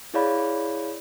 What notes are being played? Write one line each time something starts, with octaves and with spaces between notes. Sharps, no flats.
E4 G#4 C#5 D5 F5 B5